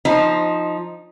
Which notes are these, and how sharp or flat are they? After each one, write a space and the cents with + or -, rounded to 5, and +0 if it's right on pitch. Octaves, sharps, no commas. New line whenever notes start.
F3 +0 D#4 +0 C5 +15